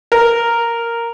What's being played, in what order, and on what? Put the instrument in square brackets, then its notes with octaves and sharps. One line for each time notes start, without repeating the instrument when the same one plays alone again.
[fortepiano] A#4